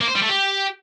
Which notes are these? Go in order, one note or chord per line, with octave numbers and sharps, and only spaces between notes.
A#3
C5
G3
A3
G4